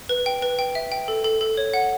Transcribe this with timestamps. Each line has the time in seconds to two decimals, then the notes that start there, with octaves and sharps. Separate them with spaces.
0.09 B4
0.26 G5
0.42 B4
0.59 G5
0.75 E5
0.92 G5
1.08 A4
1.24 A4
1.41 A4
1.57 C#5
1.74 F#5